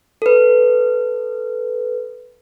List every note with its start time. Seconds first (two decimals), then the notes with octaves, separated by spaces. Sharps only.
0.22 A4 B4